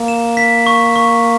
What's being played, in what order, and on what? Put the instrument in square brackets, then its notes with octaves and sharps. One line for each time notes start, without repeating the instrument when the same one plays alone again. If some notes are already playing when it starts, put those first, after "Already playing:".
Already playing: [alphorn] A#3
[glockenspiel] E7
B6
C#6
C#6